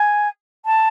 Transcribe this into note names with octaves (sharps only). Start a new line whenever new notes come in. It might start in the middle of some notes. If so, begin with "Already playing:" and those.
Already playing: G#5
A5